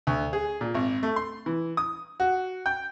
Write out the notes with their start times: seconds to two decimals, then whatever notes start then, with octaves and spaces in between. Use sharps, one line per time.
0.07 D2
0.33 G#4
0.61 A#2
0.74 G#1
1.03 A3
1.16 C6
1.46 E3
1.77 D#6
2.20 F#4
2.66 G5